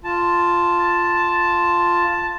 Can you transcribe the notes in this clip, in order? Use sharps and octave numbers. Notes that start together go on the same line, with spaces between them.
F4 A5